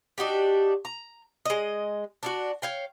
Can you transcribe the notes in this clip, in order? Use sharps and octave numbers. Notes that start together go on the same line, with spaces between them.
D4 D#4 F#4 G4
A#5
G#3 D#5
D4 E4 F#4
C#5 F5 G5